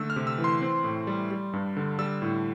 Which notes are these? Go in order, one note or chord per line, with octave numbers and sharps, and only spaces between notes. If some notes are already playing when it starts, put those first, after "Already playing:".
Already playing: D3 A3 E6
F6
C3
E6
E3
C6
C4
A2
G3
G3
G2
D3
G3 E6
A2